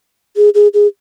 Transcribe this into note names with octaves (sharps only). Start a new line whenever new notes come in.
G#4
G#4
G#4